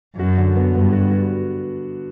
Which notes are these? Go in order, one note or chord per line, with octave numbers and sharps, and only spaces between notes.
F#2 F#4
D3
B3
G2 B3
F#4
F#4